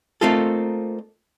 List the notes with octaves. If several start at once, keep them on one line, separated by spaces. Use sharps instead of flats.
A3 A#3 C4 D#4 F4 A4